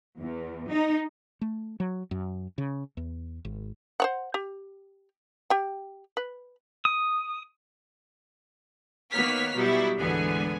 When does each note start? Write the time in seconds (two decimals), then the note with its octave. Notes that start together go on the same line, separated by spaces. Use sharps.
0.18 E2
0.68 D#4
1.41 A3
1.80 F#3
2.11 F#2
2.58 C#3
2.97 E2
3.45 G#1
4.00 C5 C#5 F#5
4.34 G4
5.50 G4 G5
6.17 B4
6.85 D#6
9.11 D#3 A#3 B3 C#5 F6 B6
9.55 B2 F#3 G3 E4
9.98 D2 G#2 D3 E3 B3 G#5